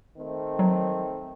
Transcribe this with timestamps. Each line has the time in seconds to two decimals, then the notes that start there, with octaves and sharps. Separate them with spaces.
0.17 D#3 A3 C4
0.59 F#3